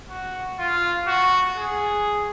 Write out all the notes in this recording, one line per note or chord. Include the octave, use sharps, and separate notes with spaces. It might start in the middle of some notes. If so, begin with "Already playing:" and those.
F#4
F4
F#4
G#4